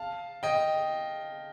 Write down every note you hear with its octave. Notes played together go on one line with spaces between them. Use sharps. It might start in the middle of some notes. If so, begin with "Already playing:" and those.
Already playing: F5 A5
D#5 G5